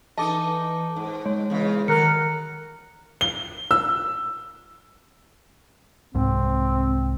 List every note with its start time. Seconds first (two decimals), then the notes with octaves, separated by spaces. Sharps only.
0.18 E3 D#4 A4 D#5 A5 D6
0.96 G#2
1.25 G#3 C#5
1.50 E2 C#3
1.88 D#3 F#3 A4 A#4 F#6 C#7
3.21 G7
3.71 E6
6.15 C2 G#2 C4